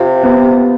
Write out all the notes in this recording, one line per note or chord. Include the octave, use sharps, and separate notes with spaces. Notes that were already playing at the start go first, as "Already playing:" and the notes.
Already playing: C3 F4
B3